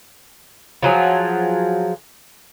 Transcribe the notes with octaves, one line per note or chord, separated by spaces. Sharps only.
F3 F#3 G#4